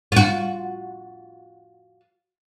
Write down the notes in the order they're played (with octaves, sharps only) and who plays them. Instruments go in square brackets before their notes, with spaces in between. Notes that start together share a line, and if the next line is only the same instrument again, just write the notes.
[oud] F4 F#4